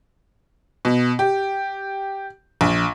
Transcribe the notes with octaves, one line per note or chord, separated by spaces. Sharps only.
B2
G4
A#1